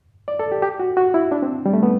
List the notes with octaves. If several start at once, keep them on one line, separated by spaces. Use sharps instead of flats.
D5
A4
G4
G4
F#4
F#4
E4
D4
C4
G3
A3
B3